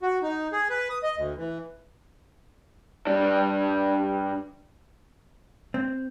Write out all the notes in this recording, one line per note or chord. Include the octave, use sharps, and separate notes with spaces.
F#4
D#4
G#4
B4
D#6
D#5
D2
E3
G2 D4
C4